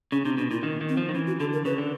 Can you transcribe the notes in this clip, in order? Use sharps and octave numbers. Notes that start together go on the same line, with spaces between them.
C#3 C#4
C3 D4
B2 D4
A#2 E4
D#3
D#3
C4
F3
D#3
E3 C#4
F#4
D3 A4
A#4
C#3 B4
D3